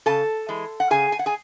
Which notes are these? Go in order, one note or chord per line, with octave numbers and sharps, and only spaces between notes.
C#3 A4 A5
E3 G#3
F#5
C#3 G#4 G#5
G#5
F#5
G#4 G#5